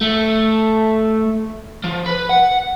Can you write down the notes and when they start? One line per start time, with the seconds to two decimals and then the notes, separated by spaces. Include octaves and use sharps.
0.01 A3
1.84 F3
2.06 B4
2.29 F#5